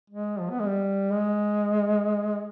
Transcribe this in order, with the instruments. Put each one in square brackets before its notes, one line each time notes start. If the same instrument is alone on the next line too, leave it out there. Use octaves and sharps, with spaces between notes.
[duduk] G#3
F3
B3
G#3
G3
G#3